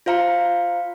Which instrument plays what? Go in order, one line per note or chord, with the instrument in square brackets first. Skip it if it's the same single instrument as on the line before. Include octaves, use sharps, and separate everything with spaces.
[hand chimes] F4 C5 F5 A#5 C#7